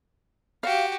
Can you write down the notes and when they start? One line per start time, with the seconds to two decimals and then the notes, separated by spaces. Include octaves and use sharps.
0.63 F#4 G4 F5